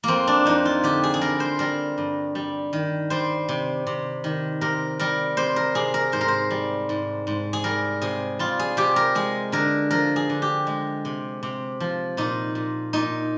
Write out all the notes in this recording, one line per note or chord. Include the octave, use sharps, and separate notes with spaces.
F2 A#3 C4
D4
F2 D#4
F4
D3 G4
G#4
G#4
G3 A#4
C5
G3 A#4
G2
G3
D#3
G3 C5
C3
C3
D#3
C3 A#4
G3 A#4
C3 C5
A#4
C3 G#4
A#4
G#2 C5
A#4
C5
G3
G#2
G#2
G#4
G3 A#4
C3 G#4
G3 F4
G#4
C3 G4
A#4
G#3 G#4
D3 A#4
F3 A#4
G#4
D3
G4
G#3
C3
C3
F3
A#2 D#4
A#2
A#2 D#4